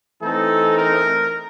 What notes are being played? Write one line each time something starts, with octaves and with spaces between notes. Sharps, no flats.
E3 A3 C4 D#4 A4
A#4